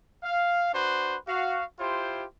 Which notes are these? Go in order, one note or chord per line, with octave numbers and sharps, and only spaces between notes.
F5
D4 F#4 B4 C5
F#4 F5
E4 F4 G4 C5